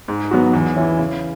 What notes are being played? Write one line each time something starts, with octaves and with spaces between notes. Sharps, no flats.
G#2
F#3 B3 F#4
E2
E3 C#4 E4
C#3